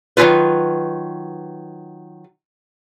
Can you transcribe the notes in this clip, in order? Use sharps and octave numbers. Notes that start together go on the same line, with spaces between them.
D#3 F#3 C4 D#4 F4 B4